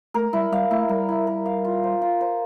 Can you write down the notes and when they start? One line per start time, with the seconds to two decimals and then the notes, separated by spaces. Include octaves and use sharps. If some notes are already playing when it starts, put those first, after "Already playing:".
0.14 A3 A#4
0.33 G3 E4
0.52 G3 F5
0.71 A3 E4
0.89 G3 A#4
1.09 E4
1.27 A#4
1.46 F5
1.65 F4
1.84 C5
2.02 F4
2.21 C5